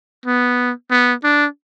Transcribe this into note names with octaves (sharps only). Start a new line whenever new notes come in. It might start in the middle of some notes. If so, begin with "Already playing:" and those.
B3
B3
D4